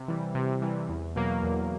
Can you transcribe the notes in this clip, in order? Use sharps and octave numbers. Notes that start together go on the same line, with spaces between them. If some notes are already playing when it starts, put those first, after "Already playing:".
Already playing: C3
E3 G3
C3
E3 G3
E2
B2 F#3 A#3
E2